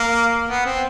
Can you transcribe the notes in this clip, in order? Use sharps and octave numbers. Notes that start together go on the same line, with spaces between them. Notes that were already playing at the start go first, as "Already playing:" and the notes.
Already playing: A#3
B3
C4